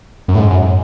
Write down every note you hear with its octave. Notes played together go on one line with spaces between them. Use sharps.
F#2
A2
G#2
F#2